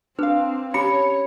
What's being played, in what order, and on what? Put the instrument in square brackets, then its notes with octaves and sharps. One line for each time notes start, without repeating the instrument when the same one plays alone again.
[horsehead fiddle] C4 [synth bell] D4 F5 [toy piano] B4
[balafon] C#4 G4 [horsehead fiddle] C#5 [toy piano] B5 [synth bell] C#7